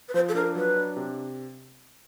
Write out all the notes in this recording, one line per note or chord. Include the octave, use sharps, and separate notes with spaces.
B4
F3 C5
A4
D4 A#4
F#3 B4
D4
C3